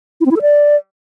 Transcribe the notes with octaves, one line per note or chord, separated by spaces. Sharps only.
E4
C4
E4
A4
D5